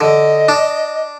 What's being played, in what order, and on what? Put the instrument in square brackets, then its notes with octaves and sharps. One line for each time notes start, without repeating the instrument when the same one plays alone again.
[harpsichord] D3 [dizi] D#5
[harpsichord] D4